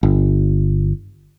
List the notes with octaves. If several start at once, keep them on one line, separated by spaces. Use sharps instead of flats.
G1